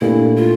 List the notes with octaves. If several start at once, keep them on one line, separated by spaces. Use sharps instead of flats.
A#2 A3 D4 E4 G4
F4